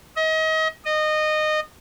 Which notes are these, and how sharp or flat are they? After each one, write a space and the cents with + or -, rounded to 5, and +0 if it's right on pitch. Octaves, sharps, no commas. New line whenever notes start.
D#5 +35
D#5 -20